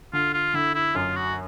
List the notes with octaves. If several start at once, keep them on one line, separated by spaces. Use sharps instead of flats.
D3 F4
F4
D3 E4
E4
F#2 F4
F#4